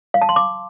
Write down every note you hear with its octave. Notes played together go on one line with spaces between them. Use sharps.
F5
A5
C6
D6